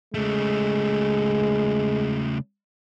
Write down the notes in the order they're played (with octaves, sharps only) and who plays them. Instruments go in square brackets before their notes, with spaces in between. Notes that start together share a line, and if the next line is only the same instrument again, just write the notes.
[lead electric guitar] C#3 A3 [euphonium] G#3